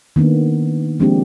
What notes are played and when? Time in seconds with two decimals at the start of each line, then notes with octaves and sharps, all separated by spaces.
0.16 D#3 A#3 B3 D4
1.00 F3 G#3 A#3 C4 D4 G4